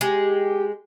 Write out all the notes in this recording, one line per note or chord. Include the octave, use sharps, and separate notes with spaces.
G#3 G4